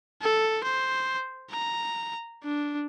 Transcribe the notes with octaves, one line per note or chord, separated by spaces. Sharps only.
A4
C5
A#5
D4